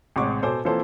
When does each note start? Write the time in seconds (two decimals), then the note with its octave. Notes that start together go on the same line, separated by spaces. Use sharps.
0.16 A1 C3 G#3 F#5 C#6 D6
0.42 B2 A4 C5 G#5 C6 D6
0.65 E3 F3 A#3 C4 A4 C5